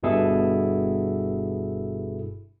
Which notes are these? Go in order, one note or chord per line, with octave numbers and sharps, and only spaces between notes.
G1 G2 B2 E4 G#4 A4